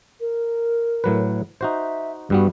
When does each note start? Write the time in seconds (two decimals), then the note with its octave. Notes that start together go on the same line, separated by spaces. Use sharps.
0.20 A#4
1.04 A2 F#3 B4
1.61 D#4 F#4 C5 E5
2.30 G2 G3 B3 F#4